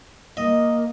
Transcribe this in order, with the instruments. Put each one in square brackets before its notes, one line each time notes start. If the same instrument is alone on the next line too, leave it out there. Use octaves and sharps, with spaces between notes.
[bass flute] A#3 [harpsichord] D#5